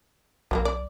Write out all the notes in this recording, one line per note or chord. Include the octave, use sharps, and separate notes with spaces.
B1 F#3 G3 A#3
D5